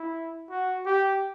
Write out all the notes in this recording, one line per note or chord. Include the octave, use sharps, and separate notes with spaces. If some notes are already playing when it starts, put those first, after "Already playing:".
Already playing: E4
F#4
G4